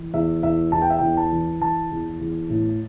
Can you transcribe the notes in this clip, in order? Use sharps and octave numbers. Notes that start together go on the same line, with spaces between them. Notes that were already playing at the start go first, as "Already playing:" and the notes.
Already playing: E3
E2 E5
E2 E5
E2 A5
G5
E5
E2 G5
A5
E3
E3 A5
E2
E2
A2